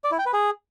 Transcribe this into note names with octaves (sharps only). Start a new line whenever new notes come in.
D5
E4
G5
B4
G#4